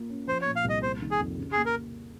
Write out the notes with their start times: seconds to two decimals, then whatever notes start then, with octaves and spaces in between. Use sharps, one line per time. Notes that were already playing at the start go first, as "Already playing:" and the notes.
Already playing: A#3 F4
0.09 C#4
0.28 F3 C5
0.42 A#2 C#5
0.56 F5
0.64 C2 D#5
0.82 A#3 C5
1.01 D#3
1.11 G#4
1.19 F2
1.38 C#3
1.52 A#3 G#4
1.66 A#4